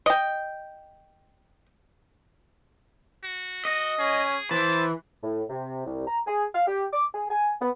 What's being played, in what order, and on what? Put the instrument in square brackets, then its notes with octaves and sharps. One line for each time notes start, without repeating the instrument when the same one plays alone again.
[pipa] D#5 G5
[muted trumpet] F#4
[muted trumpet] F#4 [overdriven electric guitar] D#5
[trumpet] C#4 [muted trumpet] G#4
[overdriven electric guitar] E3 [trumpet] C5 [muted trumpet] A5
[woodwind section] A2
C3
C2
A#5
G#4
F5
G4
D6
G#4
G#5
B3